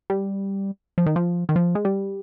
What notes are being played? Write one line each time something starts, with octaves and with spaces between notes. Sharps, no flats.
G3
F3
D#3
F3
D#3
F3
G#3
G3